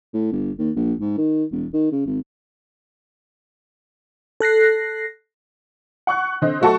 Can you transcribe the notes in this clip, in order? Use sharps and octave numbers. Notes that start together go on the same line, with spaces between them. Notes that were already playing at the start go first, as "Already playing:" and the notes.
A2
G1
D#2
A#1
G#2
D#3
E1
D#3
C#3
G#1
A4 F#6 A#6 C7
F#5 C#6 F#6
D3 C4 D#5
F#3 A3 F#4 A4 A5 C#6